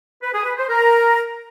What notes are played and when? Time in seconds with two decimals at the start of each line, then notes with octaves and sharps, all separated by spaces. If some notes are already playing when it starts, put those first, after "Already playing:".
0.23 B4
0.34 G#4
0.46 B4
0.57 C5
0.69 A#4